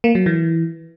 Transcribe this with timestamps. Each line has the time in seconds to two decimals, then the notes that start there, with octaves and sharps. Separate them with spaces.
0.04 A#3
0.15 F#3
0.26 E3